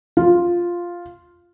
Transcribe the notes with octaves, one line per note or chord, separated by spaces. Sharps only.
F4